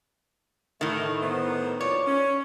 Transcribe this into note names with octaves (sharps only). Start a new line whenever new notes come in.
A2 D#3 A3 E4
B3 C5
A#2 F3 C#5 D5
C#4